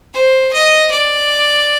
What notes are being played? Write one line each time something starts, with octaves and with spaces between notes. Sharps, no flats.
C5
D#5
D5